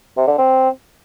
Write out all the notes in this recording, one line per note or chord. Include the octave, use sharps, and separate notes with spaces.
C3
D3
C4